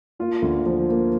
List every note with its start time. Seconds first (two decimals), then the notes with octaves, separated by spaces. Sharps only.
0.19 A#3 F4
0.42 D2
0.66 F3
0.89 A#3